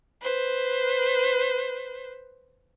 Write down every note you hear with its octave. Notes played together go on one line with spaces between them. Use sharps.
B4 C5